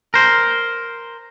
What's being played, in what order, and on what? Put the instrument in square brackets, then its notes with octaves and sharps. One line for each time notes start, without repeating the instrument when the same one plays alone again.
[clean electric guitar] A#4 C5